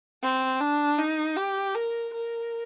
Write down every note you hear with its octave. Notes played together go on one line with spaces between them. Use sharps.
C4
D4
D#4
G4
A#4
A#4